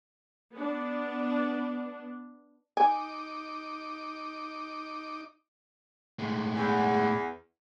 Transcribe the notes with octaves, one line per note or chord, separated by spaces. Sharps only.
B3 D4
D#4 G#5 D6
A2 G#3
E2